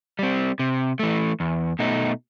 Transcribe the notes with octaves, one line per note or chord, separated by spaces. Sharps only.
G3 C4
C3
E3 A3
E2
B2 A3 D#4